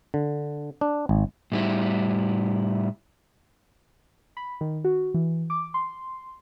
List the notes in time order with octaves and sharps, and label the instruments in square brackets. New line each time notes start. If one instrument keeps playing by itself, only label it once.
[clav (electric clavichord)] D3
D4
G#1
[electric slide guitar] A2 G3 E4
[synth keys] B5
D#3
F#4
E3
D6
C6